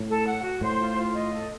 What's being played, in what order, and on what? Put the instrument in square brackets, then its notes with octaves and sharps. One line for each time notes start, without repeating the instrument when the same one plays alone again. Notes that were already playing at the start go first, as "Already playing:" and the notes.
Already playing: [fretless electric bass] A2
[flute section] A4
F#5
F#4
[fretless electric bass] A2 [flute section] C5
[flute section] F4
F4
D#5
A4